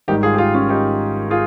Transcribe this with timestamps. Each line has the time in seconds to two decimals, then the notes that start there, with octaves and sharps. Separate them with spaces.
0.08 G#1 G#2 D#3 G3 D#4 G4
0.23 F4 G#4
0.34 G4
0.38 F4 G#4
0.54 C#4 F4
0.69 D#4 G4
1.30 F4 G#4